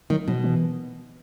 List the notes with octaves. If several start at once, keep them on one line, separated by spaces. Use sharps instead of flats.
D#3 F#3
B2 F3
E3